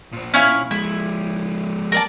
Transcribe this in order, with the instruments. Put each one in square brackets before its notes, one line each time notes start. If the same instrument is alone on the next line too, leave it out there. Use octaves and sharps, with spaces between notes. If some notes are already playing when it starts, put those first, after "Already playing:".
[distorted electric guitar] A#2 C5
[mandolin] C#4 E4 F5
[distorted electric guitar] F3 G#3 [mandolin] E4
[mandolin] A#4 D5 A5